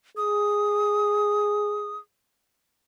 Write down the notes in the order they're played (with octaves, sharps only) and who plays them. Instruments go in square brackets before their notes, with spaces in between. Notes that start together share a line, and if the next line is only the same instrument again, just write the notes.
[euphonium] G#4 [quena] D#6